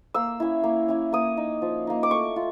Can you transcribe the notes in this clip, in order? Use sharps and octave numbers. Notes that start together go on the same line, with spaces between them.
A#3 E6
C#4 E4
A#3
C#4 E4
A#3 D#6
D#4
F3
A#3 D#4
D6
A3 C#6
F4